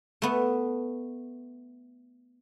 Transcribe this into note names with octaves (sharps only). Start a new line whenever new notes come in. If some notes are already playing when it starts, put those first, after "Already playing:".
A3 B3